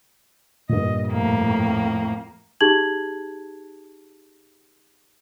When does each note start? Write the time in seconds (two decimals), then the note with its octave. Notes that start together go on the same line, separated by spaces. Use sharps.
0.69 G2 A#2 D#5
1.07 F2 A2 A#3
2.61 D#4 G4 G#4 A5 G#6 F#7